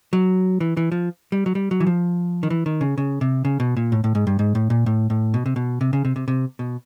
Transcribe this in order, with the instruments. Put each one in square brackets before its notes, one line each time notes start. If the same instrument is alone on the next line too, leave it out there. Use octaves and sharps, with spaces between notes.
[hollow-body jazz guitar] F#3
E3
E3
F3
G3
F#3
G3
F#3
E3
F3
D#3
E3
D#3
C#3
C#3
C3
C#3
B2
A#2
A2
A2
G#2
G2
G#2
A2
A#2
A2
A2
B2
C3
B2
C3
C#3
C3
C3
C3
B2